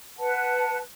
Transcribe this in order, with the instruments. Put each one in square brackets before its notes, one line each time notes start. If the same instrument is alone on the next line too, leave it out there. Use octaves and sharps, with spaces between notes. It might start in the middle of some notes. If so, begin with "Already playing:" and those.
[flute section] B4 F#5 A5